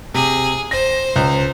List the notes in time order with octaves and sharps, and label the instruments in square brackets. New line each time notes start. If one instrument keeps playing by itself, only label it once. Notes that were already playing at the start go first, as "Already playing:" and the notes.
[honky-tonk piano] C3 [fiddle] G#4
[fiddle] C5 [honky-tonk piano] A#6
[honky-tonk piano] C#2